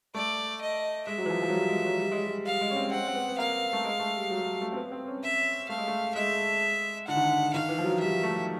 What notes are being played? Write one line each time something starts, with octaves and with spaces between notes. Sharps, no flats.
A3 D5
D#5
G#3 E5
F#3
E3
F3
F3
F#3
G3
G#3
F#3
G3
G#3
G3
G3 F5
G#3
C#4
C4
C4 F#5
C4
B3
B3
A#3 F5
A3
G#3
A3
G3
F#3
G3
A3
C4
B3
C4
C#4
E5
A3 F5
G#3
A3
G#3 E5
D3 F#5
D#3
D3
D#3 F5
E3
F3
F#3
G3 E5
A3